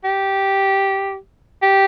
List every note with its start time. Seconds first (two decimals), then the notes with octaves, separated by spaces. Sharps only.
0.04 G4
1.63 G4